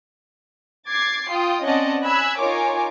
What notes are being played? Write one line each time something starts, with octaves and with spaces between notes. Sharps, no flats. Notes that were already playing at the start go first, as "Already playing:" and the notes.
D6 G#6 A6 C7
F4 G5 D#6
C4 C#4 D5 D#5 F#5 A5
G#5 B5 E6 F#6 G#6 B6
D#4 F4 A#4 C#5 G#5 D6